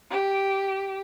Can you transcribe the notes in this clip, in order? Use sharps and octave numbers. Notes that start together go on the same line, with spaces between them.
G4